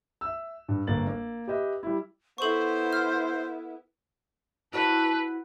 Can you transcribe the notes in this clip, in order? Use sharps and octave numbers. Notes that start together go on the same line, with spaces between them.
E5 E6
G2
G1 A#3 A6 F#7
A#3
G4 B4 D#5 E5
G3 E4
B3 E4 A4 C5 C#6
F6
E4 F#4 B4 C#5 A5